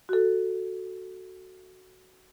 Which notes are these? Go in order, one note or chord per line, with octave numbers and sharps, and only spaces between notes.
F#4 A4